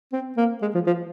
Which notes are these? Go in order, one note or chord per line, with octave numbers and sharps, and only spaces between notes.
C4
A#3
G#3
F3
F3